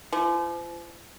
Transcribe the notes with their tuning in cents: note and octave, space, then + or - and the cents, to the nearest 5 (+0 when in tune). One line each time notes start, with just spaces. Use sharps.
F3 -40